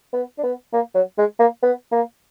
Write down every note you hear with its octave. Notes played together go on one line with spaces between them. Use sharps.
B3
D4
B3
A#3
F#3
G#3
A#3
B3
A#3